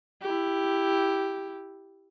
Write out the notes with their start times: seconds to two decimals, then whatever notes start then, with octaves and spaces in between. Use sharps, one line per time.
0.22 E4 G4